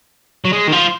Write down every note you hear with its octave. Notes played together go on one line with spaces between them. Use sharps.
F#3
G#3
D#3
F3